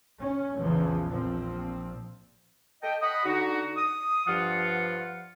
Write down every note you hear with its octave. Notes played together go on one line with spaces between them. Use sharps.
C#4
A#1 E2 C#3 E3 F3
A#1 A#2 F3 C4
A4 D#5 G5
D#5 F#5 B5 D#6
D3 D#4 F#4
D#6
G2 F3 F4 F#5